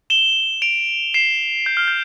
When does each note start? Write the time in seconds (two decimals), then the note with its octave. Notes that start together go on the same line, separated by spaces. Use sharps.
0.10 E7 G7
0.62 D7 F7
1.14 C7 E7
1.66 G6
1.77 F6
1.88 G6